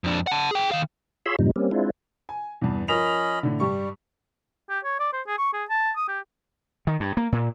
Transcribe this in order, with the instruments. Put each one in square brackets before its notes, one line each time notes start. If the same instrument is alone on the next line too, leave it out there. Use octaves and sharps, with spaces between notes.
[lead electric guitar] F2 D4
F#5 A5
G#4 G5
D#3 F5
[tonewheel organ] F4 G#4 C#5 B5 C6 E6
F#2 A2 C3 F3 G3 D#4
G3 A#3 C4 C#4
G#3 C4 D4 E4 F4
[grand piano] G#5
E2 G2
[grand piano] F3 A#4 F7 [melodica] C#4 D#5 B5
[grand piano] A2 D3
[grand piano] G2 G4 C#6 [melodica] G3
[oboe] G4
C#5
D5
C5
G#4
C#6
G#4
A5
D#6
G4
[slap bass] D#3
G2
A#3
A#2